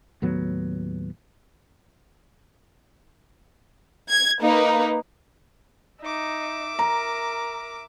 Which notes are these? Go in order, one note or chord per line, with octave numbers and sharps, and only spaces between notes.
D#2 A2 F#3 B3
G#6
A#3 D#4 B4
D#4 E5 D6
A#4 A#5